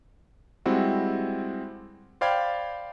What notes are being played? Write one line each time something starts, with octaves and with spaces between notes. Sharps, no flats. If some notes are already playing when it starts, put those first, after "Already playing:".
G3 G#3 C4 E4 F#4
C5 D5 F5 G5 B5 G#6